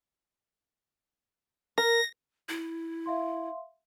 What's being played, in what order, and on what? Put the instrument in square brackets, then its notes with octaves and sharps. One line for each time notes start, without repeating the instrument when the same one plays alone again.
[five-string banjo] A#4 [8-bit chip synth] A#6
[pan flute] E4
[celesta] E5 F5 C6